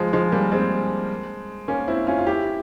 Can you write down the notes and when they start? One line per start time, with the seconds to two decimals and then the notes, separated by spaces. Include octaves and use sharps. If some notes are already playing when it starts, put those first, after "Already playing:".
Already playing: F3 G#3
0.13 F3 G#3
0.32 G3 A#3
0.52 G#3 C4
1.68 A#3 C#4
1.88 C4 E4
2.07 C#4 F4
2.18 F4
2.26 E4 G4